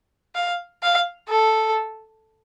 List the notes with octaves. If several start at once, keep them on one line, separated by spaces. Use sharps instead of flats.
F5
F5
A4